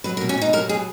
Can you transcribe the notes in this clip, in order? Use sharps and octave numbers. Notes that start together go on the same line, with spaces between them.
F#3 B4
A#4
B2
C#4
B2 D#4
F#3 A#4
B2 G#4